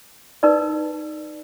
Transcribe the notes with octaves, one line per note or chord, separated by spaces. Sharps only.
D#4 A#4 B4 D5